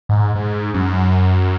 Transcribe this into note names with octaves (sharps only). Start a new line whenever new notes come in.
G#2
G#2
F#2